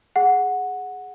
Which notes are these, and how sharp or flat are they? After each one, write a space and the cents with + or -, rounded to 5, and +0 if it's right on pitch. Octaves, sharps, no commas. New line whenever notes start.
G#4 +0 F#5 -10